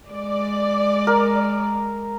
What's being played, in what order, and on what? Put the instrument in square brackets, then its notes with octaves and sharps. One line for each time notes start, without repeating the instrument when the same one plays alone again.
[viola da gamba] G#3 [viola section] D5
[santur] A#4